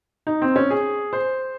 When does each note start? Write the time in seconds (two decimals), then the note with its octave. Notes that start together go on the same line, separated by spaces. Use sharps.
0.27 D#4
0.42 C4
0.56 C#4
0.70 G#4
1.13 C5